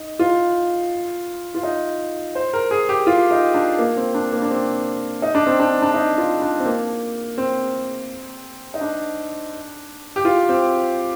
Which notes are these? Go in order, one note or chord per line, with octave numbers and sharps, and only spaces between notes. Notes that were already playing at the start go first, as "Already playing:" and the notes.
Already playing: D#4
F4
F4
D#4
C5
A#4
G#4
G4
F4
D#4
D4
A#3
C4
D4
A#3
D4
C4
D#4
D4
C4
D4
D4
D#4
F4
D4
C4
A#3
C4
D#4
D4
G4
F4
C4